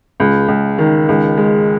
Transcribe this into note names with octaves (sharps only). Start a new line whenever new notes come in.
C#2
C#2
D#3
C#2
G#3